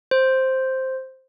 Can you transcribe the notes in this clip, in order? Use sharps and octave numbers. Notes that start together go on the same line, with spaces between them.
C5